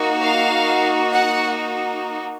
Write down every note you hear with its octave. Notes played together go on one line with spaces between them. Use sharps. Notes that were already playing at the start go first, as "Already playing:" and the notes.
Already playing: A#3 D#4 F#4
F5
F#5